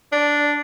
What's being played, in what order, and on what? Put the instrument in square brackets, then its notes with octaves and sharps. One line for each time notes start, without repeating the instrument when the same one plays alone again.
[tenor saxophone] D4